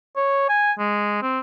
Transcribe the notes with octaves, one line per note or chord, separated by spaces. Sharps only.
C#5
G#5
G#3
C4